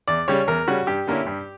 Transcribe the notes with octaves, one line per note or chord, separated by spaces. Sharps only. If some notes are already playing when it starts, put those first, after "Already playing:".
E2 D5
C#3 G3 C#4 C#5
E2 A#4
C#3 G3 C#4 F#4
G2 G4
D3 A#3 C#4 E4
G2